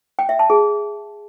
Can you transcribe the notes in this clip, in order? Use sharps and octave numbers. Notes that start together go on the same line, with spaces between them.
G5
E5
A5
G#4